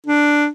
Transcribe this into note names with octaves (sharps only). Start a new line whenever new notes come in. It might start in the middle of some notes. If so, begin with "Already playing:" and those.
D4